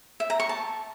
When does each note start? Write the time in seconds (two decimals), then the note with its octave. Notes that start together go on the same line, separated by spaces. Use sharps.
0.20 E5
0.30 A#5
0.40 C#6
0.49 A5